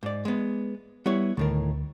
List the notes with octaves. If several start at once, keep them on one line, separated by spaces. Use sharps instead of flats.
G#2 D5
G#3 B3
G3 B3 E4 C#5
D2 A2 D#3 A#4